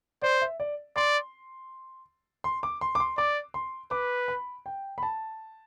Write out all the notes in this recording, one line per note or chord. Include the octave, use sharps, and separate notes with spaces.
C5 D5
E5
D5
D5 C6
C6
D6
C6
D6
C6
D5 D6
C6
B4 D6
B5
G5
B5
A5